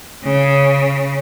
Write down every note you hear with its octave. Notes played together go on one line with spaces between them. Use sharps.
C#3